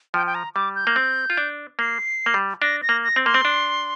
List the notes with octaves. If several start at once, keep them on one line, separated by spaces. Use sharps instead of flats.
F3 G5
G5
A#5
G3 D6
G6
A#3
C4
F4
D4
A#3 C7
A#3
G3
D4 A#6
A#6
A#3
A#6
C4
A#3 C6
C4
D4